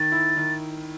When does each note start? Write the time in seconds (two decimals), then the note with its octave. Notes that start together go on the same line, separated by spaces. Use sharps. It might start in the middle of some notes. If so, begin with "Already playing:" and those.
Already playing: D#3 A6
0.12 E4
0.37 D#3